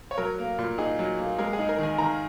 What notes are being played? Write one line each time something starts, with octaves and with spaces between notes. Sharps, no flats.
C#5
F#3 A#4
A#3
A#2
D#4 G#4
F#3
A#3
G#3 A#4
G#4
D#4
A#4
D#3 G#5
D#3 A#5